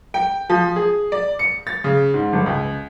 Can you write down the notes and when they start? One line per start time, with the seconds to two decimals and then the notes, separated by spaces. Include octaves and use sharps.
0.14 G5
0.50 F3
0.76 G#4
1.12 D5
1.39 C#7
1.67 A6
1.84 C#3
2.14 G#2
2.33 G1
2.46 C#2